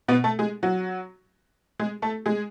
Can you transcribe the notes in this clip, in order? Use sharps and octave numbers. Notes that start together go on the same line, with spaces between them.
B2 B3
A3 A4
G#3 G#4
F#3 F#4
G#3 G#4
A3 A4
G#3 G#4